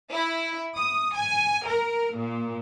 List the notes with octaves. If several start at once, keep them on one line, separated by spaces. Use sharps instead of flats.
E4
D#6
G#5
A#4
A#2